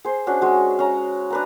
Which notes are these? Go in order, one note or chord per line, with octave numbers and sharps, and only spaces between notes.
G#4 C5
C#4 D4 F#4
G#3 F#4
C#4 A#5
D4 B4 A#5